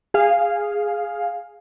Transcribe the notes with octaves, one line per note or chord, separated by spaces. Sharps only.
G#4 F5